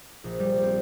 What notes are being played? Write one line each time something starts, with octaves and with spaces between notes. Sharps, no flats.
A#1
G3
C4